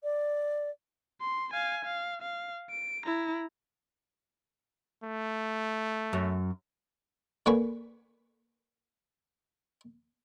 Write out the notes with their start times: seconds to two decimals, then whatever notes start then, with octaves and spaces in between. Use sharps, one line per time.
0.03 D5
1.21 C6
1.54 F5 G#5
1.85 F5
2.22 F5
2.70 D7
3.06 E4 A#5
5.04 A3
6.13 F#2
7.46 D3 A#3 B4 G#5 C#6